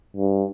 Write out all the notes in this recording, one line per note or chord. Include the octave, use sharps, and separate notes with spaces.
G2